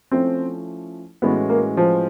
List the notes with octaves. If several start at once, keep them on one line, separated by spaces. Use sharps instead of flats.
F3 A3 C4 C#4 E4
A2 E3 G#3 B3 C#4 F#4
A#3
F3